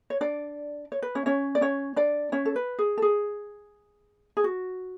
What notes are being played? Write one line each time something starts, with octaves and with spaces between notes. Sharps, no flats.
C#5
D4 D5
C#5
B4
C#4 C#5
C#4 C#5
D5
C#4 C#5
D4 D5
C#4 C#5
A4
B4
G#4
A4
G#4
G#4
F#4